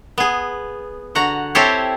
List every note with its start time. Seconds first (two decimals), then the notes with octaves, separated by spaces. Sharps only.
0.18 B3 G#4
1.15 D3 F#4 F#5 A#5
1.55 C4 E4 G4 A4 C5 C#5